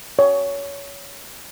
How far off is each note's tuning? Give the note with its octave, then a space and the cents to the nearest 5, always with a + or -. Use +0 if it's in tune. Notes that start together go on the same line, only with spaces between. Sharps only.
C#5 +20